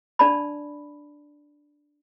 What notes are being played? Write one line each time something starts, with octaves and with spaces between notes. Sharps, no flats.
D4 D5 A5 B5